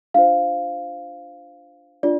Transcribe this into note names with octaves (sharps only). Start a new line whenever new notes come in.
D4 F4 C5 F5
D4 F4 D5